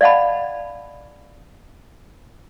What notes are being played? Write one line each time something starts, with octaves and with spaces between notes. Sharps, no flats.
D5 D#5 F5 F#5 A5 B5